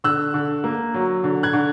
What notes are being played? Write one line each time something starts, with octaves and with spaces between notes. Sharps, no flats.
D3 E6 F#6
D3
A#3
F#3
D3
F#6 G#6
D3